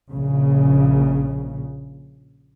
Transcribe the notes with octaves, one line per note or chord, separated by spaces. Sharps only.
A#1 C#3